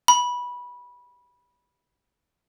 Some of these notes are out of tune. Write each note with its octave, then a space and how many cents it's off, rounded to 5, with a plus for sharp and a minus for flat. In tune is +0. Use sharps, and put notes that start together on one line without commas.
B5 -15